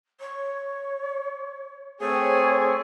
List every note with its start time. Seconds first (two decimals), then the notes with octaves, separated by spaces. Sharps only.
0.20 C#5
2.01 A3 C4 G#4 C#5